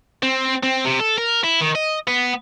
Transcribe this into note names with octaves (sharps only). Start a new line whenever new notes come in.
C4
C4
C3
A4
A#4
E4
D#3
D#5
B3